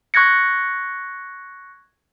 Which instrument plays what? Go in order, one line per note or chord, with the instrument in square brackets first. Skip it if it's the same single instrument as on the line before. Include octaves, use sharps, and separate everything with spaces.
[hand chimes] C#6 F#6 G#6 A#6 C#7